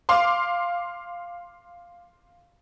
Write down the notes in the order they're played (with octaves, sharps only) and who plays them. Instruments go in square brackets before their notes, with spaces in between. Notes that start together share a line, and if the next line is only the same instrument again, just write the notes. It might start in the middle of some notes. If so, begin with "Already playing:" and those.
[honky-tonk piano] F5 C6 D6